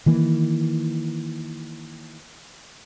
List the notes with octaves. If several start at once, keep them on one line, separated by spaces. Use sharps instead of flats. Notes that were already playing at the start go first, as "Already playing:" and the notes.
D#3 E3 A#3